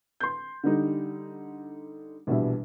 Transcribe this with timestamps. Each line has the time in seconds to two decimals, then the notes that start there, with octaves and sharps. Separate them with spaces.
0.20 C6 G6
0.64 D3 G3 D#4
2.27 A#1 B2 E3 G3 E5